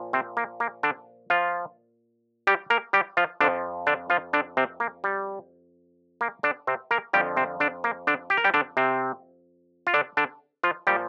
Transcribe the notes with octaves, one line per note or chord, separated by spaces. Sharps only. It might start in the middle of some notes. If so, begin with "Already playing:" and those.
Already playing: A#2 F3
C3 C4
A#3
A#3
D3 D4
F3 F4
G3 G4
A#3 A#4
G3 G4
F3 F4
F2 D3 F3 D4
D3 D4
F3 F4
D3 D4
C3 C4
A#3
G3
A#3
D3 D4
C3 C4
A#3 A#4
F2 D3 F3 G3 G4
C3 C4
D3 D4
A#3
D3 D4
G4
A#4
G3 G4
D3 D4
C3 C4
F4
D3 D4
D3 D4
F3 F4
A#2 F3 G3 G4